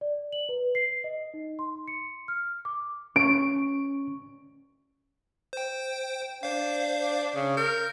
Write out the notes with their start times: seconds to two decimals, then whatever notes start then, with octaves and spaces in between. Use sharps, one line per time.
0.01 D5
0.32 F#7
0.49 B4
0.75 C7
1.04 D#5
1.34 D#4
1.59 C6
1.88 C#7
2.28 F6
2.65 D6
3.16 C#4 C#6 D7
5.53 C5 G5
6.43 D4 C5 F5
7.35 C#3
7.57 A#4 G6